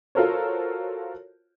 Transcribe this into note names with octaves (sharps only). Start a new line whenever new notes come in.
F4 F#4 A4 A#4 C5 C#5